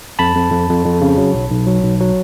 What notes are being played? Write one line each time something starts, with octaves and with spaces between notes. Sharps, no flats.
F2 A5 B5
F2
F2
F2
F2
C#3
F#3
B1
B1
F#3
B1
F#3